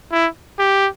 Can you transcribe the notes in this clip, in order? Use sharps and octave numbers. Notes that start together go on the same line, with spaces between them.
E4
G4